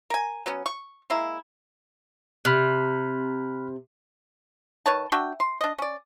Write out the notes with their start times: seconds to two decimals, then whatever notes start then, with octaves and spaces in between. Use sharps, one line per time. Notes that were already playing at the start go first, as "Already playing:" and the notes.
0.10 A#4 G#5
0.46 F#3 B3 C#4
0.66 C#6
1.10 G#3 A#3 E4
2.45 C3 B5 F6 F#6
4.86 D#3 B4 C#5 A5
5.12 D4 F#4 E5 G5
5.40 C6
5.61 D4 D#5
5.78 C#4 D5